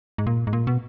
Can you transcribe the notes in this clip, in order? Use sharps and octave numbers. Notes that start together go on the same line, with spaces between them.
G#2
A#2
G#2
A#2
B2